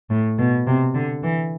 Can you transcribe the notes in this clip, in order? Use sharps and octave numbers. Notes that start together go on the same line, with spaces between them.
A2
B2
C3
D3
E3